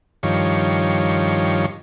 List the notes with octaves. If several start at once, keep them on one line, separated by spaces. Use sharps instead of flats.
G2 D#3 F3 C#5